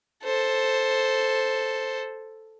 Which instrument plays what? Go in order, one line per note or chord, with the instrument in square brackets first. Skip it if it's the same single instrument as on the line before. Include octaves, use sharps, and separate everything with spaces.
[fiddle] A4 C5